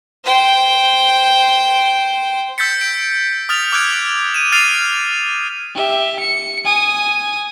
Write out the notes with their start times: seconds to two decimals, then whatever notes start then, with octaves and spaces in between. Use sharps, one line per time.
0.24 C5 G5
2.58 E6 G6 A6 B6 C#7
2.81 D7
3.49 D#6 F6 A6 F7
3.72 D6 E6 F#6 G#6 D7
4.34 D#7 E7
4.52 F6 A6 C7 D7 D#7 F7
5.74 G4 E5
6.20 C#7
6.65 G#5 D#6